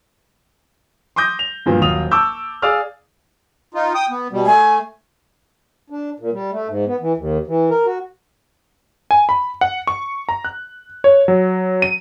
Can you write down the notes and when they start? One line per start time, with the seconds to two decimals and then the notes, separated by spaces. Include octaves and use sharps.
1.16 C6 D6 D#6 G6 A#6
1.39 F7
1.66 G2 A#2 F3 B3
1.81 D#1 F3 F#3 F4 D#6 F7
2.11 A5 C#6 D6 E6 G6
2.62 G#4 D5 F5 E6 F6
3.74 D#4 F4
3.94 G5 D#6
4.10 B3
4.32 B2 G3
4.46 A3 G#5
5.90 D4
6.20 A#2
6.33 G3
6.52 A3
6.68 G#2
6.86 B3
7.00 E3
7.17 D#2
7.47 E3
7.70 A#4
7.86 F#4
9.11 G#5
9.29 B5
9.61 F#5
9.87 C#6
10.29 A#5
10.45 F#6
11.04 C#5
11.28 F#3
11.82 D#7